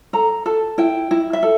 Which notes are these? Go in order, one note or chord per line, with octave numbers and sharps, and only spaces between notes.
A4 A#5
A4 A5
E4 G5
E4
E5
A4